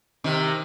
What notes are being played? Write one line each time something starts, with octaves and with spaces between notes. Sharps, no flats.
C3 D#3